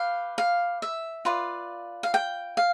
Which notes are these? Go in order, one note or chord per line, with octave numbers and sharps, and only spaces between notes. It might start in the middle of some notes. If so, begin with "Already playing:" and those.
Already playing: G4 B4 F5
F5
E5
F4 B4 D5
F5
G5
F5